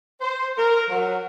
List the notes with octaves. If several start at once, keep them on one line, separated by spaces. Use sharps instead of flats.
C5
A#4
F#3